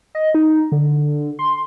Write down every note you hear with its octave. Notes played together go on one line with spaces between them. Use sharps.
D#5
D#4
D3
C6